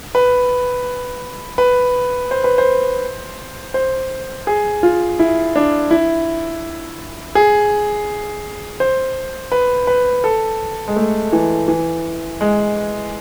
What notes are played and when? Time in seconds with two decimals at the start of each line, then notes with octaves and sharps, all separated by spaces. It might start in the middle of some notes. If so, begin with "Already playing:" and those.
0.15 B4
1.58 B4
2.31 C5
2.44 B4
2.58 C5
3.74 C5
4.47 G#4
4.83 F4
5.19 E4
5.56 D4
5.91 E4
7.35 G#4
8.80 C5
9.52 B4
9.87 B4
10.24 A4
10.88 G#3
10.96 A3
11.33 E3
11.68 E3
12.41 G#3